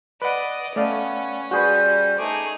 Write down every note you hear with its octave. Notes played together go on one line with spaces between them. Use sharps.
B4 D5 D#5 F#5
A3 B3 C#4 D5 F5
G3 F#4 G#4 B4 C5
A3 D#4 G#4 D6